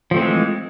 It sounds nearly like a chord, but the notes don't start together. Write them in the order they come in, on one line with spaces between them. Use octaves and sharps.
F3 A3 C4 E3 G#3